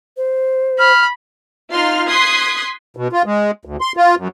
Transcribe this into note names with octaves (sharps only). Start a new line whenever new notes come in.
C5
B5 F6
D#4 F4 C6 F6
C6 D#6 F#6 G#6 B6
B2
F4
G#3
D2
C6
F4
F#2